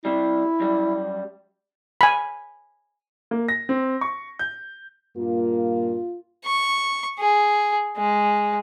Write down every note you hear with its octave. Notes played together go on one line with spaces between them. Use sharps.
C3 G3 E4
F#2 G3
G#5 B5
A#3
A#6
C4
C#6
G6
G2 A#2 A#3 F4
C#6
G#4
G#3